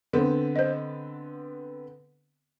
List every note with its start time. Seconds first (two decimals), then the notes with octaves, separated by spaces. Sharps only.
0.13 D3 B3 C4
0.56 C5 D#5